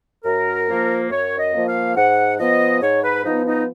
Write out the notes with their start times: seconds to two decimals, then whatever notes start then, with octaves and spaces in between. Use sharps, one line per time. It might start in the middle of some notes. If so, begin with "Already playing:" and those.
0.25 F#2 A#4
0.68 F3 A#3
1.10 F#2 C#5
1.39 D#5
1.54 F3 A#3
1.68 F5
1.96 G#2 F#5
2.39 F3 B3 D#5
2.82 G#2 C#5
3.04 B4
3.25 F3 B3 D#4
3.46 D#4